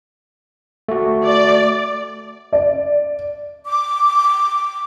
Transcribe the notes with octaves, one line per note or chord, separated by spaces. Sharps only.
A3 F#4
D5
D5
D6